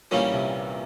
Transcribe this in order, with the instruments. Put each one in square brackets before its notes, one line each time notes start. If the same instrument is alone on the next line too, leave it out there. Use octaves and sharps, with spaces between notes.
[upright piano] A#1 A#2 [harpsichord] E3 G3 A#3 C#4
[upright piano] C3